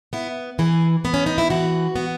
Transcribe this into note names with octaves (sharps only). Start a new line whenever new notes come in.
B3 E4
E3 G#4
B3
C#4
D#4
E4
E3 F#4
B3